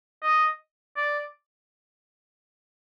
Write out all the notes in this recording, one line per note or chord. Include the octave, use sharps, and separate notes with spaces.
D#5
D5